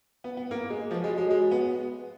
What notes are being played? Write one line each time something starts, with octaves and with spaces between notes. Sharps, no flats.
B3
B3
A#3
G#3
F3 F#3 B3 F#4
G#3
G#3
G#3
B3